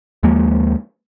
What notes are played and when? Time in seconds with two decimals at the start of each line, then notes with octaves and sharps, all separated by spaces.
0.23 D#2 F3 G#3 A#3